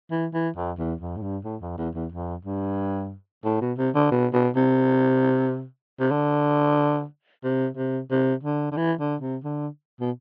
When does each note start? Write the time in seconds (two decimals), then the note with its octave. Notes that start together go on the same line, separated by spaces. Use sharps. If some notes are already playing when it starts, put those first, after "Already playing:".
0.11 E3
0.33 E3
0.56 F2
0.78 E2
1.00 F2
1.17 A2
1.22 G2
1.44 A2
1.61 F2
1.78 E2
1.95 E2
2.12 F2
2.45 G2
3.44 A2
3.61 B2
3.78 C3
3.95 D3
4.11 B2
4.33 B2
4.56 C3
6.00 C3
6.11 D3
7.44 C3
7.77 C3
8.11 C3
8.43 D3
8.71 D3
8.77 E3
9.00 D3
9.21 C3
9.44 D3
10.00 B2